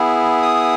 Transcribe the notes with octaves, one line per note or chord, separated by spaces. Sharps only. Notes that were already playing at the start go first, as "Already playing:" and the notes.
Already playing: B3 E4 G#4
D#6